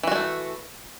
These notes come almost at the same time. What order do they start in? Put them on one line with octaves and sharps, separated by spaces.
E3 F#4 G#3 A3